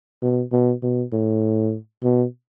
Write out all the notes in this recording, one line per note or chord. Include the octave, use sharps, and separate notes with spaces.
B2
B2
B2
A2
B2